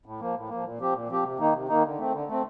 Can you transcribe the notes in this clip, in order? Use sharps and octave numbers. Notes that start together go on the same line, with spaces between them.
A2
F3 A#3
A2
F3 A#3
A#2
F3 C4 G4
A#2
F3 C4 G4
C3
D#3 A#3 D#4
C3
D#3 A#3 D#4
D3
A3 C4
D3
A3 C4